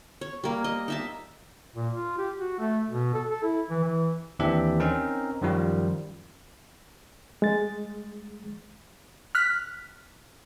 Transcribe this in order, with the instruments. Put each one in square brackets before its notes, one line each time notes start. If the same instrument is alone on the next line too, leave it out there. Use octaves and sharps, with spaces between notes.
[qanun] C#5
G3 A#3
D#5
D#4 E5 A5
[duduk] A#2
F4
G4
F#4
A3
B2
A4
A4
E4
E3
E3
[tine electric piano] D#2 E3 C4 D4 G4 E5
C4 C#4 D#4 A#4
F#2 D#3 F3 G3 F4
[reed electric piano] G#3 A6
[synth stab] F6 F#6 B6